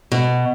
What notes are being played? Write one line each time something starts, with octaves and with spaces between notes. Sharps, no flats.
B2